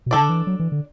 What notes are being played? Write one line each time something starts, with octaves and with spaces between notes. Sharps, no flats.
B2
C#3 D4 A4 D5
D3
E3
F#3
E3
D3